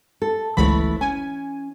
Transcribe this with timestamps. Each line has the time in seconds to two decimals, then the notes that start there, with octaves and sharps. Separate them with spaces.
0.22 A4
0.57 G1 C#2 E3 A3 C#5 B5
1.01 C#4 G#5